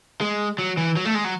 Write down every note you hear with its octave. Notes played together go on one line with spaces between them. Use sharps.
G#3
F#3
E3
F#3
A3
G#3
F#3